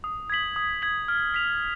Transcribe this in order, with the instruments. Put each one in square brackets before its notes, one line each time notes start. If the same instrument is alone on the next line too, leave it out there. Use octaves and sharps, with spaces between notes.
[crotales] D#6
G#6 B6 F#7
D#6
G#6 B6 F#7
F6
B6 F7